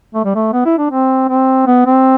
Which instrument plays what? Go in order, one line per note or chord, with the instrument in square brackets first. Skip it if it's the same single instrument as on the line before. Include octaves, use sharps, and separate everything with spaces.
[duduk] A3
G3
A3
B3
E4
D4
C4
C4
B3
C4